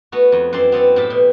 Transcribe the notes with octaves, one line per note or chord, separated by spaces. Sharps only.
A3 B3 F#4
F2
F#2 E3 C4 C5 D5 C6
B3 C4 A4 D5
A2 G4 A5 B5
B2